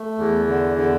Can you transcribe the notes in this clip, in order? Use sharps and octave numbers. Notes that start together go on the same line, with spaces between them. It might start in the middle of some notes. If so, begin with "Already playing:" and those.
Already playing: A3
E2
D3
D3